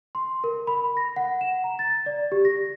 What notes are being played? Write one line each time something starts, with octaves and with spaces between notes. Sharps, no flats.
C6
A#4
B5
A#6
F#5
E7
A#5
A6
D5
G4
A#6